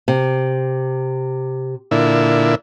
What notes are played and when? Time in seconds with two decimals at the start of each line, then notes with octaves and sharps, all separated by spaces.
0.08 C3
1.91 A#2 D3 E4